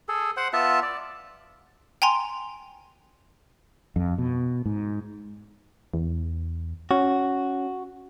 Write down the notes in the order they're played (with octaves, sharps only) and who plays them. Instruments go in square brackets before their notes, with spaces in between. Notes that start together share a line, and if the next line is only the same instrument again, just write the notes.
[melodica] G#4 A4
C5 F#5
B3 F4 E5 A5
D5
[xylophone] G5 G#5 A#5 C6
[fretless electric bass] F2
B2
G#2
[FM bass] E2
[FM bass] C#4 [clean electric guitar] F#4